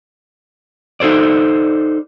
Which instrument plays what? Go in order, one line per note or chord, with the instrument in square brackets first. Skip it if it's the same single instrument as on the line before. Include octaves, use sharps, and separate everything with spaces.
[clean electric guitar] D#4 A4 C5 D5